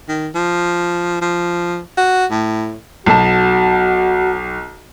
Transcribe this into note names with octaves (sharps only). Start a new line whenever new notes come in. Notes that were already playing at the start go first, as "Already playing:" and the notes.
D#3
F3
F3
F#4
A2
B1 F#4 A5